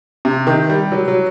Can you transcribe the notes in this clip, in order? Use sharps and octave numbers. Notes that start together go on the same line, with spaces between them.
C3
D#3
G3
F#3
F#3